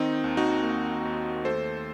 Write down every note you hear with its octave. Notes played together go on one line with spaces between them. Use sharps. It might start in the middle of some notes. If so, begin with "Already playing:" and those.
Already playing: D#3 C4 D#4
D#2
D#4 F#4
A#3
D#2
A3 A4 C5